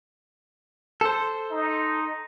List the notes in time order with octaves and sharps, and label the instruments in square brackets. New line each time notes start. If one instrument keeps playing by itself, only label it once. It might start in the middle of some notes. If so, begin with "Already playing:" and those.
[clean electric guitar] A4 C5
[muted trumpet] D#4